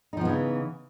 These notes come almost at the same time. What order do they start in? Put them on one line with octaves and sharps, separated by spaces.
D#4 F3 B3 C#3 E3